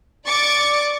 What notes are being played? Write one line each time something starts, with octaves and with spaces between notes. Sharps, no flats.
D5 C#6 D6 A6 C#7